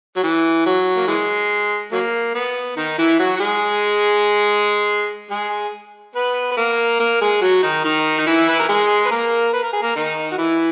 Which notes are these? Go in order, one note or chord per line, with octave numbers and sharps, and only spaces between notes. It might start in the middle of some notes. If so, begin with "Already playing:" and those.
F#3
E3
F#3
A#3
E3 G#3
F#3 A#3
B3
D#3 D#4
E3 E4
F#3 F#4
F#4
G#3 G#4
G#3 G#4
B3 B4
B4
A#3 A#4
A#3 A#4
G#3 G#4
F#3 F#4
D#3 D#4
D#3 D#4
D#4
E3 E4
B4
A#4
G#3 G#4
B4
A#3 A#4
B4
A#4
G#4
A#3 A#4
D#3 D#4
F#4
E3 E4